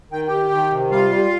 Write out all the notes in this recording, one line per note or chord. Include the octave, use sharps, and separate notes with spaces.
D#3 G5
D#3 G4 G5
D#3
C3
G3 F4 F5
G3